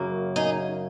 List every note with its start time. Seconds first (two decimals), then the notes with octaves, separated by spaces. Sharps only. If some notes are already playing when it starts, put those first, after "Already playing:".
Already playing: F#2 C#3 A#3
0.36 D#4 G#4